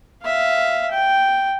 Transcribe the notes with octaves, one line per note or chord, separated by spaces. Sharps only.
E5 F5
G5